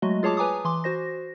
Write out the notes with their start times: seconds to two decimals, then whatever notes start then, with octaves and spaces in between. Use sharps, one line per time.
0.02 F#3 G#3 A3 F#4 D#5
0.23 F4 G#4 C#5 A5 D6
0.37 B4 G#5 A#5 D6 D#6
0.65 E3 C6 D6
0.84 F#4 C5 A#6